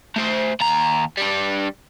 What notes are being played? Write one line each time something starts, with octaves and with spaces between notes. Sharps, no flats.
A3 C5
D#2 A#5
G3 D4